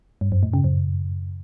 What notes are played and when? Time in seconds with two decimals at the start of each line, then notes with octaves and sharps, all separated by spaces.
0.21 G2
0.32 F#2
0.43 A2
0.53 C#3
0.64 F#2